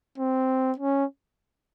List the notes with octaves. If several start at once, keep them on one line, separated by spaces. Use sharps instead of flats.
C4
C#4